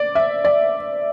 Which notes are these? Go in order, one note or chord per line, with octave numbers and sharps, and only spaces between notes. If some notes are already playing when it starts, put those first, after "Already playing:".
Already playing: D5
E5
D5